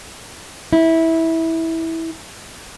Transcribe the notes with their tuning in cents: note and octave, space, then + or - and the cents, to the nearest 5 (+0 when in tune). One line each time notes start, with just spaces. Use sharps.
E4 -15